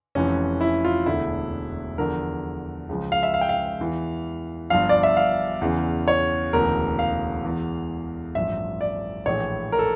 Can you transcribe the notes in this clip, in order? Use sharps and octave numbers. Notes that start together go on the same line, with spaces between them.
F1 F2 E3 C#4
E4
F4
E1 D2 D3 E4
E2 D3 F3 A#4
C#2 C#3 F3
F5
E5
F5
G5
F5
E2 E3
G1 G2 F3 F5
D5
E5
F5
E2 C#3 E3
C#5
E1 D2 C#3 E3 A#4
F5
E2 E3
A1 G2 F3 E5
D5
A#1 A2 E3 C#5
A#4
A4